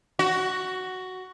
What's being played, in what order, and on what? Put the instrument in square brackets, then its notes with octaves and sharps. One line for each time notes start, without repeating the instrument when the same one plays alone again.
[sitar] F#4